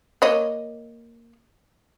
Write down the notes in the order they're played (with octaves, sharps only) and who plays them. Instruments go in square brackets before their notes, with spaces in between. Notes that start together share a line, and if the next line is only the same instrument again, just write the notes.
[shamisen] A#3 C#5 D#5